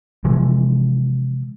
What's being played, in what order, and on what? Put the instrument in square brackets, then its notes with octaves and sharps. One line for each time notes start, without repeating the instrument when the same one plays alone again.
[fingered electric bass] C3 E3 F3 G#3